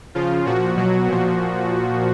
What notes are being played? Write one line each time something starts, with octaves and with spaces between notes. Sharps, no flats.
C#3 F3 F4
A#2 F3 F#4
B2 F#3
A#2 F3